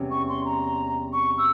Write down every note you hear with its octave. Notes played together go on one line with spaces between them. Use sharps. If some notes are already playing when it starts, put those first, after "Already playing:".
Already playing: E2 C3 G3 C#4
C#6
C6
A#5
C#6
E6